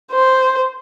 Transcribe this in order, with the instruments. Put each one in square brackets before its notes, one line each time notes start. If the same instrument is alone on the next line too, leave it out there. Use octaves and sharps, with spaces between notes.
[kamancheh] C5